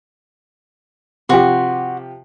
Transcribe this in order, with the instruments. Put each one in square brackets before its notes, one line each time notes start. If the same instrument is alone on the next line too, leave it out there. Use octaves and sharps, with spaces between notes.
[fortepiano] C3 F3 G4 [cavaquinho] F#4 C6